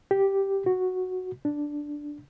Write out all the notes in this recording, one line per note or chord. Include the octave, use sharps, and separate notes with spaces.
G4
F#4
D4